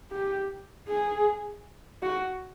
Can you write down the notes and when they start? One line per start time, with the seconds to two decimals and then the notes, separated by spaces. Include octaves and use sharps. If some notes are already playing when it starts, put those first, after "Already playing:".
0.11 G4
0.88 G#4
2.02 F#4